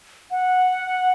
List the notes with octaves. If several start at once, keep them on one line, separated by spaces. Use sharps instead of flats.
F#5